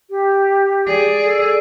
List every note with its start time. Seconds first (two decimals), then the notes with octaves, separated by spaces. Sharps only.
0.10 G4
0.87 G#4 D5
1.25 A4